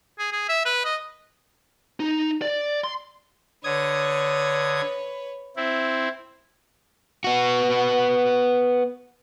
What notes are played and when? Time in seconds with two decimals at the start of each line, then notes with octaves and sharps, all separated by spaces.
0.19 G#4
0.33 G#4
0.49 E5
0.66 B4
0.85 D#5
2.00 D#4
2.42 D5
2.84 C6
3.64 D3 B4 C#5 D#6 G#6
5.56 C4 E4
7.24 B3 F#4